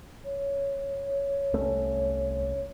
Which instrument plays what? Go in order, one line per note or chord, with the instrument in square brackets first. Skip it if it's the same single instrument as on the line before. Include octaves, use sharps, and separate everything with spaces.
[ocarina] C#5
[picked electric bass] C2 A3 C#4